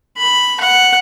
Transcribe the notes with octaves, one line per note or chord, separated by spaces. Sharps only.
B5
F#5